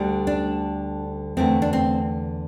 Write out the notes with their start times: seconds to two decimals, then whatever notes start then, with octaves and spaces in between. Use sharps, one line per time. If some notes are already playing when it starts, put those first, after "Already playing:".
Already playing: D2 D3 G3
0.27 D4
1.37 E2 D3 A3 C4
1.62 D4
1.73 C4